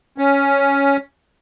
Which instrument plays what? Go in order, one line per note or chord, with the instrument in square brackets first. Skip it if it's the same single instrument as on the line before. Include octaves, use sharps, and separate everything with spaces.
[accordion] C#4